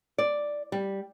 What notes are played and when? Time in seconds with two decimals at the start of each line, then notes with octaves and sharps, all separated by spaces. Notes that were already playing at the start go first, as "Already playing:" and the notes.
0.18 D5
0.72 G3